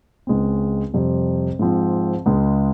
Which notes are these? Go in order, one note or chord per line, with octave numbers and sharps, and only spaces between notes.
C#2 C#3 G#3 C4
F2 C3 G3
G#2 F3 C4
C#2 C#3 G#3